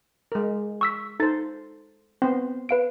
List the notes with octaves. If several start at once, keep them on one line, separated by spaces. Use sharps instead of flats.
G#3 A#4
C#6 E6 B6
D#4 A4 C5 A6
B3 C4 C5
B4 F5 D7